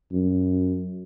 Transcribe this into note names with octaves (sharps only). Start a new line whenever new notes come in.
F#2